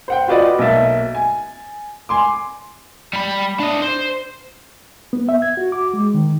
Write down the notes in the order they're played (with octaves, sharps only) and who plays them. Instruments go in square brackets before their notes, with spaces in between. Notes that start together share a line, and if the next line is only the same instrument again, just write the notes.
[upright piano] C5 F#5 G5
F4 F#4 B4 D5 D#5 F#5
B1 A#3 D#5 E5 A6
G#5
G#5 C6 D6
[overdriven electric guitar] G3 B5
D4 D#5
C5
[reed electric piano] B3
E5
G#6
F#4
D6
G#3
D#3